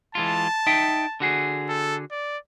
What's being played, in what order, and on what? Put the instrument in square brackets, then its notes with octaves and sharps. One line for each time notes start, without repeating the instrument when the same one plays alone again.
[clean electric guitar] E3 G#3 F4 [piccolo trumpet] A5
[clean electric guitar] D#4 E5 G5
D3 F#4 G#4
[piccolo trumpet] A4
D5